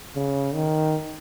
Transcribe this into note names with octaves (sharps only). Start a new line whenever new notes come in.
C#3
D#3